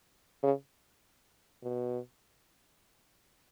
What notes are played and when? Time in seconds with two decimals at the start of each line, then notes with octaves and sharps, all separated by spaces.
0.43 C#3
1.63 B2